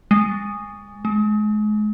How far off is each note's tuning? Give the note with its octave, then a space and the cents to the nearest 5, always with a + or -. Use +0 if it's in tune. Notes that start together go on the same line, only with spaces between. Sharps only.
G#3 -15
G#3 +35